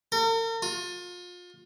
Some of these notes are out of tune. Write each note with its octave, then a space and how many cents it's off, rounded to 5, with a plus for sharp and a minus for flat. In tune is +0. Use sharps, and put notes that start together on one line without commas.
A#4 -45
F4 +30